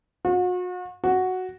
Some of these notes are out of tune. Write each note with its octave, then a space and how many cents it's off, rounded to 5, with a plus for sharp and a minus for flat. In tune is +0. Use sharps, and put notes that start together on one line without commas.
F#4 -40
F#4 +0